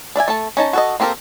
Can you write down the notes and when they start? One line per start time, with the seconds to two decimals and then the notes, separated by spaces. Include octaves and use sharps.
0.16 D4 D5 E5 G#5
0.28 A3 A4 A5
0.57 C#4 D#4 A5
0.73 F#4 A4 D#5
1.00 A#3 C4 G4 A4 A#4